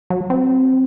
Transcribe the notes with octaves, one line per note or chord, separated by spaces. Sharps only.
F#3
C4